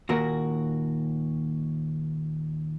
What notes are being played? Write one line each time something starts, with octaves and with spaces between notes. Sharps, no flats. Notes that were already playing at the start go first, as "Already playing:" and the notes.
D#2 A#2 F#4 A#4